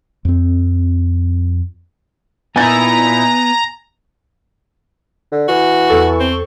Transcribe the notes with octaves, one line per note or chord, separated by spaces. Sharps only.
F2 C4
A#2 B3 D#4 E4 G#5 A#5 A6
D3
E3 F#4
E2 A4 C#6
C4